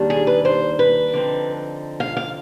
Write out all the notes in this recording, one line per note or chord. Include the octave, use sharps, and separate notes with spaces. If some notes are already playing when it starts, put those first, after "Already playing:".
Already playing: D#2 D#3 G3 D4
G#4
B4
C5
B4
D3 F3 C4 D#4
F5
F5